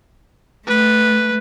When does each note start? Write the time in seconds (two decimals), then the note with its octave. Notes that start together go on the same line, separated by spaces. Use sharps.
0.67 A3 B4